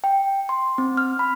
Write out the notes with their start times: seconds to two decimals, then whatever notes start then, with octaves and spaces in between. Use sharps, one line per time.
0.04 G5
0.49 C6
0.78 C4
0.97 F6
1.19 B5